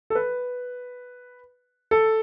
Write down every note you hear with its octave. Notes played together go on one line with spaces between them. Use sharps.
A4
B4
A4